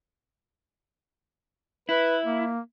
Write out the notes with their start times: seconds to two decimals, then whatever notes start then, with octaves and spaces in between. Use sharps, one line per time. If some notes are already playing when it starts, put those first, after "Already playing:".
1.89 E4 B4
2.25 A#3